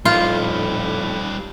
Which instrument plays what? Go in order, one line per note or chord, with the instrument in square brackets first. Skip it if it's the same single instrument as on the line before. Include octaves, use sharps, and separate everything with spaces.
[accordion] F2 A2 B5 [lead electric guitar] G3 D#4 [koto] F4